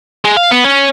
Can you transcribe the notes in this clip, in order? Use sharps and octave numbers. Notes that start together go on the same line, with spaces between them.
G#3
F5
B3
C#4